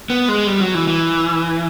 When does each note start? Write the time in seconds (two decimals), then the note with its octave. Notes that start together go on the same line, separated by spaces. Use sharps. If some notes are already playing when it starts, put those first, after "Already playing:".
0.10 B3
0.29 G#3
0.47 G3
0.60 F#3
0.74 E3
0.88 E3